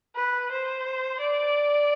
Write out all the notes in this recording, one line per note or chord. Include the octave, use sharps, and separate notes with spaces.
B4
C5
D5